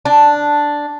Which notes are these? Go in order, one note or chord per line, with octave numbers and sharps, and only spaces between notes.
D4